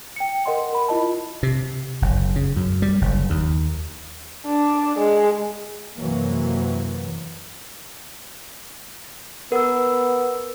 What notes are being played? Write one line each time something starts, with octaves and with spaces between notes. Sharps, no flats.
G5 C#7
A#4 D#5 F#5 C6
A#4 B5
E4 F4 D#5 A5
C3
F#1
C#3
F#2
G3
F#1
D#2
D4
G#3
F#2 C3 E3 F#3 A#3
B3 A#4 E6